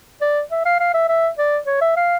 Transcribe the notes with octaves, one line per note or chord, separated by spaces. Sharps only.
D5
E5
F5
F5
E5
E5
D5
C#5
E5
F5